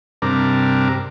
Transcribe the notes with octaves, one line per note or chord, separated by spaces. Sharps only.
G2 C3 D4 A#4